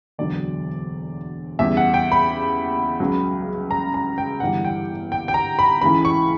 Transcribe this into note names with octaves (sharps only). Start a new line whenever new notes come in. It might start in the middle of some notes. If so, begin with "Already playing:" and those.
E1 D2 D3 F#3 D5
E2 C#3 G3 E5
F#5
G5
B5
C#2 C#3 F#3
A#5
A#5
G5
G1 G2 E3 G3 F#5
G5
G5
G5
A#5
B5
C#2 C#3 E3 B5
C#6